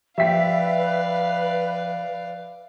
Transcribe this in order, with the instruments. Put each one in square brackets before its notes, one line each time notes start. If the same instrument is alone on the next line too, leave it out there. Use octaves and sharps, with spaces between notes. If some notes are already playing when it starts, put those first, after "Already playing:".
[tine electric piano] F3 G5 [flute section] B4 [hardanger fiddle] D5 F5 [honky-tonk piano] E5 B6